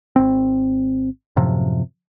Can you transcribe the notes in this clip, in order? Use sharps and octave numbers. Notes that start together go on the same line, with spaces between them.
G#1 C4
F#2 A2 C3 F3